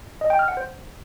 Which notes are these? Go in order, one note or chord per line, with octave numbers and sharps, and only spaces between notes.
D#5
G5
F6
F#5
C5